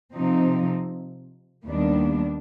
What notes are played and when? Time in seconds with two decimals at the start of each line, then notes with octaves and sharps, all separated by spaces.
0.14 C3 F3 C4 D#4
1.66 D#2 D#3 G3 B3 D4